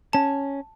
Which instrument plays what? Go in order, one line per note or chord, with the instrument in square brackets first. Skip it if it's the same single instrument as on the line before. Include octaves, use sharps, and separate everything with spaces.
[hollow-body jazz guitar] C#4 [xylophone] A5